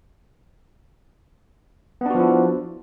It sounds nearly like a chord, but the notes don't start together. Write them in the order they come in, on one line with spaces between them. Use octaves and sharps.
B3 D4 F#4 F3 E4